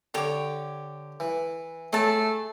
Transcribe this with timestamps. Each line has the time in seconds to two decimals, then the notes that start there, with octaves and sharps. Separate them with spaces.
0.14 D3 G4 C#5 D6
1.20 E3
1.93 A3 G#4 C#5 A5